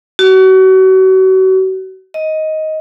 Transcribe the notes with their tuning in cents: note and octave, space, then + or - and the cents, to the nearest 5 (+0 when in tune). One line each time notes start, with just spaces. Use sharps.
F#4 +35
D#5 +10